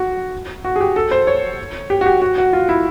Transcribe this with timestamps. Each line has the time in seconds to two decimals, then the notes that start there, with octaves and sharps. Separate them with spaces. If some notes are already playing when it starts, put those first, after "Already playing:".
Already playing: F#4
0.65 F#4
0.76 G#4
0.81 G4
0.96 A4
1.11 C5
1.27 C#5
1.90 G4
2.01 F#4
2.06 G4
2.22 F#4
2.38 F#4
2.53 F4
2.69 E4